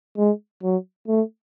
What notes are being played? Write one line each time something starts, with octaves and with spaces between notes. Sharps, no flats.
G#3
F#3
A3